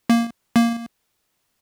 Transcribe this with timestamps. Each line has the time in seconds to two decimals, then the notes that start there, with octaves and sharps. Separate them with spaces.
0.10 A#3
0.56 A#3